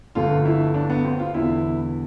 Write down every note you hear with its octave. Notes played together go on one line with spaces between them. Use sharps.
G1 F2 D3 A3 F4
E4
D4
B3
C4
F4
E1 E2 D3 E4